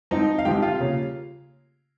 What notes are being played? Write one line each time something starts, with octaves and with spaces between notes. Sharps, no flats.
G#2 F3 C4 D#4 D#5
F5
G#2 F3 C4 G4 G5
F4 F5
C#3 G3 A#3 C#4